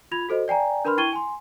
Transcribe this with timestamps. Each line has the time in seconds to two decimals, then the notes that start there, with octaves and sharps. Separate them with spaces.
0.11 F4 B5 G#6 F7
0.29 F#4 A4 C5 D#5
0.48 D5 G5 G#5 A#5
0.85 D4 A#4 B4 B5 C6 F6
0.98 E4 G5 C#6 G#6 D#7 G7
1.13 G#5 C6